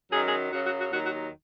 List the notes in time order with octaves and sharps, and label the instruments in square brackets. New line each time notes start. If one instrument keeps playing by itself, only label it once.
[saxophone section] F#2 D#3 F#3 G#4
G#4
F#2 C#3 F#3 F#4
F#4
F#4
D#2 D#3 F#3 F#4
F#4